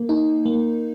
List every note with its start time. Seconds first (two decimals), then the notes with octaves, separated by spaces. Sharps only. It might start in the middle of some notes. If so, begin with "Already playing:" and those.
Already playing: A#3
0.09 D#4
0.45 A#3